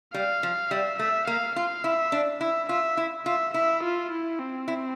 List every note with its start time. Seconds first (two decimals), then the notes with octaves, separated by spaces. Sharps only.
0.14 G3 F5
0.43 F3
0.71 G3 E5
0.99 A3 E5
1.27 A#3 F5
1.55 F4 F5
1.84 E4 E5
2.12 D4
2.41 E4 E5
2.69 F4 E5
2.97 E4
3.26 F4 E5
3.54 E4 E5
3.83 F4
4.11 E4
4.39 C4
4.68 E4